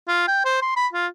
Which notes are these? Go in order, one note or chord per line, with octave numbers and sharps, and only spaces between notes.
F4
G5
C5
C6
B5
F4